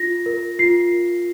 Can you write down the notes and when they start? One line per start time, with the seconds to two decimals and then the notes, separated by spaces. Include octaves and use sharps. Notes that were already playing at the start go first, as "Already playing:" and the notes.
Already playing: F4 A#6
0.26 A#4
0.59 F4 C7
0.91 A#4